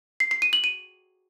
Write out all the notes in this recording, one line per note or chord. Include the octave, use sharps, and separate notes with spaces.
C7
C7
D#7
F#7
D#7